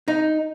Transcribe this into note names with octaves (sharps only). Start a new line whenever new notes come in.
D#4